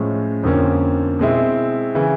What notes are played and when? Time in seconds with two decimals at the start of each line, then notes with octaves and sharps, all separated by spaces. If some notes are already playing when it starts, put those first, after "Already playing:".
Already playing: A2 F3 G#3 C#4
0.43 F2 D3 F3 A#3 C#4
1.19 B2 G#3 C4 E4
1.95 C#3 E3